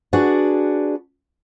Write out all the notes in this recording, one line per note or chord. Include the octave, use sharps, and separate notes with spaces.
D4 F#4 G#4 B4 D5